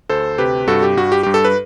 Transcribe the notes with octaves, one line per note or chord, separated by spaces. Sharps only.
D2 A4 C5
C3 G4 B4
G2 F#4 A4
G4
G2 F#4
G4
G2 G4
A4
B4